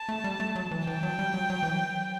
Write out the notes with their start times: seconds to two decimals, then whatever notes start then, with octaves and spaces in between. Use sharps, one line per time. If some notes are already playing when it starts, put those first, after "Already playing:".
Already playing: A5
0.09 A3
0.24 G3
0.40 A3
0.56 F#3
0.71 E3
0.87 E3 G5
1.03 F#3
1.19 G3
1.34 F#3
1.50 F#3
1.63 E3
1.75 F#3